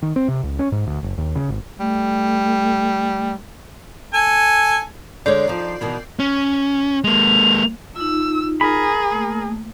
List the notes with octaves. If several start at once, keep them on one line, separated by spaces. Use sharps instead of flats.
D#3
C4
C3
C#2
C#4
G#2
D2
F#1
D#2
C#3
G#1
G3 A3
A4 G#5
D3 G#3 C#5 D5 G6 C7
F3 D#4
B2 D#3 E3
C#4
G#3 A#3 F7
D#4 F4 E6
G#4 A#4 B5
A3 A#3